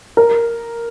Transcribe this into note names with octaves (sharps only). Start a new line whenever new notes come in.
A#4